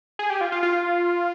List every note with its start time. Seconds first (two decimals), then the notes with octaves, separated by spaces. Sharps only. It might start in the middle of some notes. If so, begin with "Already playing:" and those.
0.19 G#4
0.30 G4
0.41 F4
0.52 F4
0.63 F4